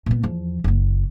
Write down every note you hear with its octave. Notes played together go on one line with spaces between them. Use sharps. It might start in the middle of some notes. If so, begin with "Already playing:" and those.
A#2 B3
E2 F3
F#1 A#3